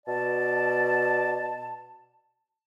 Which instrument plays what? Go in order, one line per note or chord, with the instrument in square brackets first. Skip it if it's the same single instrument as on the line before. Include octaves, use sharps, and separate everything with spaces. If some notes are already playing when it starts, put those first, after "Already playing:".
[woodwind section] B2 D5 A5